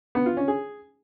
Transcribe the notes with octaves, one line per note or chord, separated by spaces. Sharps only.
B3
F4
C#4
G#4